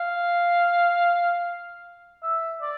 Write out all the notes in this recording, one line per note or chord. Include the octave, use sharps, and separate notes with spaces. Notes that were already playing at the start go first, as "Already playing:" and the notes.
Already playing: F5
E5
D5